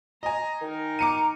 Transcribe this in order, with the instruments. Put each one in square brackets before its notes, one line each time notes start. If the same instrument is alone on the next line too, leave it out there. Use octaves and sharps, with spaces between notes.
[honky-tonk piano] D#5 G#5 [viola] A#5
[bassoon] D#3 [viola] D#4 A#4
[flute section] A#5 [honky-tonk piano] D6 C#7 D#7